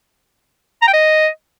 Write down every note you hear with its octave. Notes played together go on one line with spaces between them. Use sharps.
A#5
G5
D#5